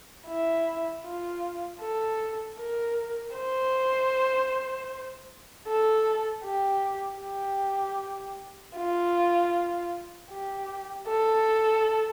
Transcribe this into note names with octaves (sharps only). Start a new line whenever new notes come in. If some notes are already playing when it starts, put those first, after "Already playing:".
E4
F4
A4
A#4
C5
A4
G4
G4
F4
G4
A4